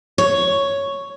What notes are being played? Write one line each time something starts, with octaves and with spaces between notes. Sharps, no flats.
C#5